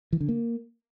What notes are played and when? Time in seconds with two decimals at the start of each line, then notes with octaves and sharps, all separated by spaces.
0.13 E3
0.21 D3
0.29 A#3